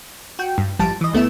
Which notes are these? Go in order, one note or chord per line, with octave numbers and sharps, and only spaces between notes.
F#4 G5
G2
A1 F3 G3 A5 D7
E3 D#5
D2 A3 B3 E4 E7